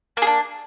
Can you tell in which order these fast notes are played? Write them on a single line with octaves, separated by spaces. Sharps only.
A#3 G#4 D4